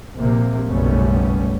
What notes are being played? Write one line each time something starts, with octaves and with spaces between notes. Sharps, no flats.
A#1 C3 A#3
F#1 B1 G3 A3 B3 C#4